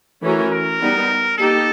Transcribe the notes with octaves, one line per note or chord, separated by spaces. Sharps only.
E3 A3 C#4 F#4 A#4
A#4
G3 B3 D#4
A#3 D#4 G4 A4